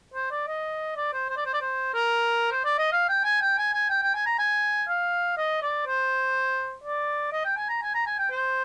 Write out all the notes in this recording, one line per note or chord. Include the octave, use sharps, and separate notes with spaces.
C5
D5
D#5
D5
C5
C5
D5
C5
D5
C5
A#4
C5
D5
D#5
F5
G5
G#5
G5
G#5
G#5
G5
G5
G#5
A#5
G#5
F5
D#5
D5
C5
D5
D#5
G5
G#5
A#5
G#5
A#5
G#5
G5
C5